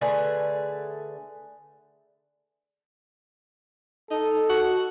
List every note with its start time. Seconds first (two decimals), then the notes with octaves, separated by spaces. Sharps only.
0.01 D3 A3 G#4 B4
4.11 D#4 A4
4.49 F#4